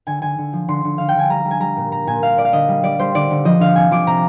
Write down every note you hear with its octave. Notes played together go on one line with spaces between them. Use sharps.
D3 G#5
D3 G#5
D3
F3
D3 C6
D3
D3 F5
G5
D3 G#5
G3 A#5
G3
G#5
G3 A#5
A#2
A#2 A#5
A#2 G#5
A#2 F5
A#2 D5
F5
D3 D#5
G3
G3 D5
G3 C5
D3 D5
D3
F3 D#5
D3 F5
C3 G#5
F3 D6
C3 A#5